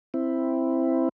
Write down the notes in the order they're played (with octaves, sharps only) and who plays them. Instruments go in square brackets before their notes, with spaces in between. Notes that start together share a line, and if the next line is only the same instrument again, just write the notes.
[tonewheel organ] C4 E4